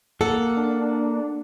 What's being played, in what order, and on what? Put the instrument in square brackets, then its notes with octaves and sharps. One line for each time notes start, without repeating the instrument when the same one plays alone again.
[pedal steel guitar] A#3 F#5 [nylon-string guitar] A4
[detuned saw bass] D4